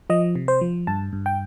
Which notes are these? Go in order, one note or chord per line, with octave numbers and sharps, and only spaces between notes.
F3 D#5
C3
C5
F3
G2 A5
G2
G5